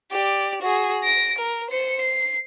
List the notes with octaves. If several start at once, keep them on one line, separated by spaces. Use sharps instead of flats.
G4 D5
F#4 G#4
A#6 D7
A#4
C5 C#7
C7